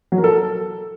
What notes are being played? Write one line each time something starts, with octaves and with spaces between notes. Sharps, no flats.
F#3
A#4
A4